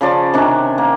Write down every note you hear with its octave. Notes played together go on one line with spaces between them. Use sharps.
C#3 F3 D5
C3 D#3 C#4 D4
A#3